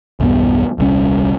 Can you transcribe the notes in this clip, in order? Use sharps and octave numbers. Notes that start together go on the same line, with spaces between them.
B1 E2 G2 B3
D#1 C2 G3 C#4